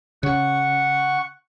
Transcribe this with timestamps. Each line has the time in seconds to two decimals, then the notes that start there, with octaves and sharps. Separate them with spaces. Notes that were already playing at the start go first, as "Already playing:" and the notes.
0.23 C#3 F#5 C#6